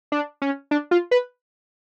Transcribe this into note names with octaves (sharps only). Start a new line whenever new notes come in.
D4
C#4
D4
F4
B4